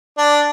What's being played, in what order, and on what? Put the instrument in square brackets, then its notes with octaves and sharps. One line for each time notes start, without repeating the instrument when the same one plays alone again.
[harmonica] D4